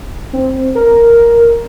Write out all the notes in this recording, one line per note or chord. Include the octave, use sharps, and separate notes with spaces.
C4
A#4